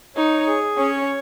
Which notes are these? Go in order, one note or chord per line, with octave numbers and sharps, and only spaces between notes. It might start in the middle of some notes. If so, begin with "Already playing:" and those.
D#4 C#5
G#4
C#4 C#5